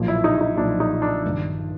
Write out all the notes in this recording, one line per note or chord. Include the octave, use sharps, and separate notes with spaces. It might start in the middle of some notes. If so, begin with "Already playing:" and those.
Already playing: B1 A#2 F3
E4
D#4
D#4
B1 A#2 F3 D4
D#4
D4
G1 G2 D#3